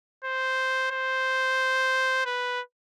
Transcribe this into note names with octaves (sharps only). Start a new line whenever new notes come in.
C5
C5
B4